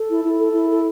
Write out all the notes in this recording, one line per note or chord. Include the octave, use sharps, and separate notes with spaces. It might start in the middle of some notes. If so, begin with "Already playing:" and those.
Already playing: A4
E4
E4
A4
E4
A4